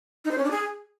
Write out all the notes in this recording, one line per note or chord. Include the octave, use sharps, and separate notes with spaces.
D#4
C5
C#4
D4
G#4